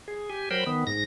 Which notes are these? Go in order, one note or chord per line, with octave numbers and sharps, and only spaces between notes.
G#4
G4 G#5
F#3 A#4 C5 G5 B5
D#3 B3
G#2 A#6